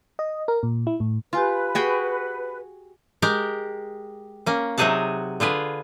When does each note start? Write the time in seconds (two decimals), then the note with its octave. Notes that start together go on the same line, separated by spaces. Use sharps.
0.19 D#5
0.48 A#4
0.63 A#2
0.87 E4
1.00 A2
1.33 F4 G4 B4 G#5 C6
1.75 F#4 G#4 G5
3.22 G#3 G4 A#4
4.46 A#3 C#4
4.78 C3 F#3 D#4 G#4 F#5 A5
5.40 D3 F4 G#4 B4